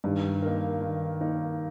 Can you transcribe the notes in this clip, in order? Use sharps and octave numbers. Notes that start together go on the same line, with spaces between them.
G2 D#3
A#3 D#4 A#4
D#3
A#3 D#4 A#4